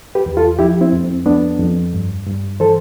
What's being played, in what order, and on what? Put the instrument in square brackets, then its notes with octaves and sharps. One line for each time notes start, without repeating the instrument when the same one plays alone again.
[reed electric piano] G4 B4
E2
F4 A4
F3 E4 G4
C4 E4
F2
C4
F2 B3 D4
F2
G2
G2
E3 A4 C5